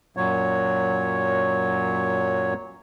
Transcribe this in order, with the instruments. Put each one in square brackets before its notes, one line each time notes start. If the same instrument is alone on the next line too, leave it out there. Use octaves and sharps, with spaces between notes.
[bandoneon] F#2 A#2 F#3 C#5